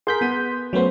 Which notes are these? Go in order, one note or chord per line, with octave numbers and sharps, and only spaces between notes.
G#4 A#4 C6 G6 B6
B3 D#7
F#3 A3 B3 C#4 C5